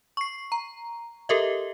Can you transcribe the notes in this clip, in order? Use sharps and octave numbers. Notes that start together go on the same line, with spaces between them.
C#6 C7
A#5
G4 A4 A#4 D#5 E5